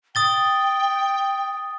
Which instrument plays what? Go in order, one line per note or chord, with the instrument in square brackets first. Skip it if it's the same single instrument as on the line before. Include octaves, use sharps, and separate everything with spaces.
[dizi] G5 [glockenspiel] D#6 A6 G7